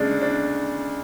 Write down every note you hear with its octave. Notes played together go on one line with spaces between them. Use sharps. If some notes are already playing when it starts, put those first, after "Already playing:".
Already playing: D2 C#3 G#3 D4
D4